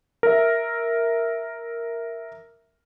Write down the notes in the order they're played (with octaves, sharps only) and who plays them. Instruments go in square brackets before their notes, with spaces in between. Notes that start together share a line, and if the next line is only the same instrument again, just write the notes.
[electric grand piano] A#4 E5